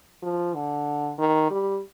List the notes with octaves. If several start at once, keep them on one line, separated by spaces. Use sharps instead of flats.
F3
D3
D#3
G3